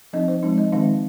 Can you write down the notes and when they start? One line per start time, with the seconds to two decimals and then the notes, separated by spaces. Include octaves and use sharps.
0.13 F3 C4 D#4 D#5
0.28 C5
0.43 F3 G#3 C4 D#4
0.58 D#5
0.72 D#3 G#3 C4 D#4 F5